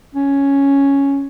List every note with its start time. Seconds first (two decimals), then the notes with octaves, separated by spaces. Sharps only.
0.15 C#4